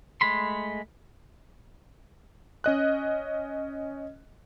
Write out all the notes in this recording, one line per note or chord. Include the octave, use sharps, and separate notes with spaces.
G#3 A3 B5 C6
C#4 D#5 F#6